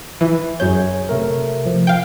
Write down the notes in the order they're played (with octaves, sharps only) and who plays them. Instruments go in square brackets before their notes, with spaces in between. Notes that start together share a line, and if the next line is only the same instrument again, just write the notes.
[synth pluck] E3
[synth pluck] F#2 G6 [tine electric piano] G#4 C#5
[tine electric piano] C3 A3 A#4
F3
[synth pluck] F5 G5